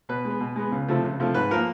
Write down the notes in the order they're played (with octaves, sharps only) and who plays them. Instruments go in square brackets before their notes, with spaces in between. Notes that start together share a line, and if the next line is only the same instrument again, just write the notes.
[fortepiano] B2 B4
G#3
B3
B2
G#3 B3
C#2
C3 F3 A3
C#2
C3 F3 A3
G#2 B4
F3 A#3 A#4